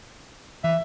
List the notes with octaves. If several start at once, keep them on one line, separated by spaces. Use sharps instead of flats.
E3 E5